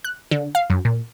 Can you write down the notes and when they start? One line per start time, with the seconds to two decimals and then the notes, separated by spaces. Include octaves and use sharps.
0.04 F#6
0.31 D3
0.55 F5
0.70 F#2
0.85 A#2